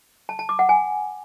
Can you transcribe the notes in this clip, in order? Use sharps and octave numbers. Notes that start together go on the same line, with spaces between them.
A5
A5
D6
F#5
G#5